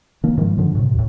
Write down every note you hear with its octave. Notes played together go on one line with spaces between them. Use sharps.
D#3 A#3
G#2 D#3 F3 G3
G2 D3 F3
A2 C3
D#2 A2